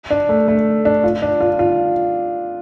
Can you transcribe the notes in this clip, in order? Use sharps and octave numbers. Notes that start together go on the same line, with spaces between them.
D4
A3
A3
D4
F4
D4
F4
F4